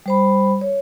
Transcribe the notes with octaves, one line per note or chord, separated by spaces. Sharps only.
G3 C5 B5
C#5